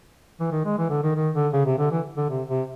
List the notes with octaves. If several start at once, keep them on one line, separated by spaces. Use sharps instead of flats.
E3
D#3
G#3
E3
D3
D#3
D#3
D3
C#3
C3
D3
E3
D3
C3
C3